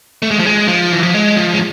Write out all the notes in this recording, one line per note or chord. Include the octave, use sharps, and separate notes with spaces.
A3
G#3
F3
G#3
F3
E3
F3
G#3
F3
G#3